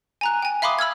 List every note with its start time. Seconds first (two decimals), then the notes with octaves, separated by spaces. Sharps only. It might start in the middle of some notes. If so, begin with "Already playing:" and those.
0.21 G#5 A#5 F#6
0.42 G5 G#5
0.62 E5 F5 B5 C6 D6 D#6
0.79 B5 E6 F6 G#6